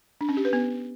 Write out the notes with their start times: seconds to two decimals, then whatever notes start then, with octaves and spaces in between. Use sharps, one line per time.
0.21 D4
0.29 C#4
0.37 G4
0.45 B4
0.53 B3